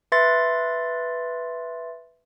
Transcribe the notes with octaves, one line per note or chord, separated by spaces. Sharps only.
B4 E5 C6 A6